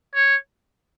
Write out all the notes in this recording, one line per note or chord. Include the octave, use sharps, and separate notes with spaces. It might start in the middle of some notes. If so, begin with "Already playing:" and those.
C#5